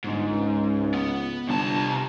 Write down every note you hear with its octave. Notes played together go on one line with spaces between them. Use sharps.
G1 G#2
C#2
B3
G1 C2 A5